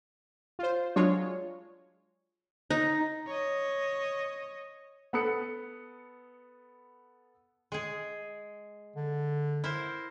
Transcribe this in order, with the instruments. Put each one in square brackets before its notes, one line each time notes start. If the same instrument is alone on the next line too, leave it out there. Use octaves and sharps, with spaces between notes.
[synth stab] F4 C5
F#3 G#3 D4 F4 C#5
[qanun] D#4
[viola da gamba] C#5 D#5
[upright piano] B3 A4 B5 D#6 F#6 C#7
[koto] G#3 G#4
[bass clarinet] D3
[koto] E4 A#4 C5